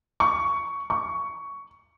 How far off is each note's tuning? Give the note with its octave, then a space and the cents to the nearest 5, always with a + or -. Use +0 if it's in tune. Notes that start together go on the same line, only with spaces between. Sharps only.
C#6 +10
C#6 +10